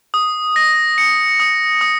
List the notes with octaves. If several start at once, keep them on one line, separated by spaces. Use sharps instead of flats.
D#6
A#6
C#7
D#6
D#6